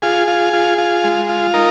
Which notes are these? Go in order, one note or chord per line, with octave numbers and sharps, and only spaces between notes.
F4 G#4
F4
F4
F4
G#3
F4
D#4 A#4